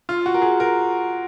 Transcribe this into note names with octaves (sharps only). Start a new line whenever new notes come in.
F4
F#4
A#4
G#4
A#4